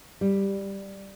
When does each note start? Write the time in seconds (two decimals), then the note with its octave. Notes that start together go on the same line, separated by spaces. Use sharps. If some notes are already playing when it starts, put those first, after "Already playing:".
0.21 G3